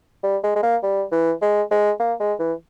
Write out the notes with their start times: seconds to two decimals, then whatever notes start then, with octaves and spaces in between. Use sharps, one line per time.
0.23 G3
0.43 G#3
0.56 G#3
0.63 A#3
0.83 G3
1.11 E3
1.42 G#3
1.71 G#3
2.00 A#3
2.20 G#3
2.39 E3